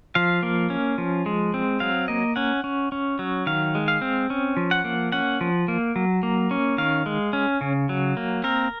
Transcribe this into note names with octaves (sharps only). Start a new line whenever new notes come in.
F3 F5
A#3
C#4
F3
G#3
C4
F#3 F5
A#3 D#5
C#4 F#5
C#4
C#4
F#3
D#3 F5
G#3
F5
C4
C#4
F3
F#5
A#3
C#4 F#5
F3
A#3
F#3
A#3
C#4
D#3 F5
G#3
C#4
C#3
F#3
A#3
C4 A#4